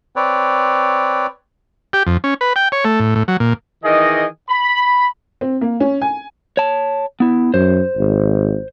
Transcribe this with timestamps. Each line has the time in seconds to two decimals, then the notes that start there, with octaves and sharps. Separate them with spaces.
0.16 C4 B4 C#5 D5
1.93 G4
2.07 F2
2.24 C#4
2.41 B4
2.56 G5
2.72 C#5
2.85 A3
3.00 A2
3.15 A2
3.28 F#3
3.40 A#2
3.84 D#3 E3 G#4 D#5
4.49 B5
5.41 C4
5.61 A#3
5.80 C#4
6.02 G#5
6.57 C#5 A5
7.20 B3 E4
7.54 F#2 C5
7.97 G#1